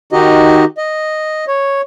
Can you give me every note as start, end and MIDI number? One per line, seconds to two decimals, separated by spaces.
0.13 0.64 51
0.13 0.64 63
0.13 0.64 66
0.13 0.64 67
0.13 0.64 75
0.78 1.45 75
1.48 1.81 73